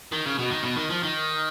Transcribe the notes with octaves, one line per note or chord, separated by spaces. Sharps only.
D#3
C#3
B2
D#3
B2
D#3
F3
D#3